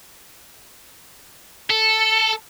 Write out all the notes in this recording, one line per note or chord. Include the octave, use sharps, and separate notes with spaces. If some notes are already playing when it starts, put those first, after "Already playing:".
A4